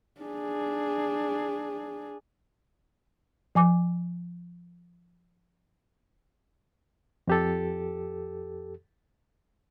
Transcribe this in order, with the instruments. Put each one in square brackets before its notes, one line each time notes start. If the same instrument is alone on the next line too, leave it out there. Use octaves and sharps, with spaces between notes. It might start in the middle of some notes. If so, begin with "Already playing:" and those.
[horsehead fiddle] D4 G#4
[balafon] F3 G#5 D6
[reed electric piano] F2 G4 A4